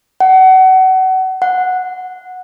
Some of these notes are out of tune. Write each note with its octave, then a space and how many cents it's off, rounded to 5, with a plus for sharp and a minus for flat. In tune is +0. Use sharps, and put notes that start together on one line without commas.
F#5 +30
F#5 -10